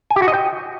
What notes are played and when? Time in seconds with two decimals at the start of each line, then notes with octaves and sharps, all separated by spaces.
0.10 G#5
0.16 G4
0.22 F#4
0.28 D#5
0.34 G5